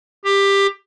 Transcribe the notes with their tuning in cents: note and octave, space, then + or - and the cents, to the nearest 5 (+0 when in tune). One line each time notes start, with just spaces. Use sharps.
G4 +15